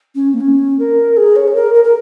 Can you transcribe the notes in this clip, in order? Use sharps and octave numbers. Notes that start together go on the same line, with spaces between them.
C#4
A#3
C#4
A#4
G#4
C#5
G#4
A#4
A#4
A#4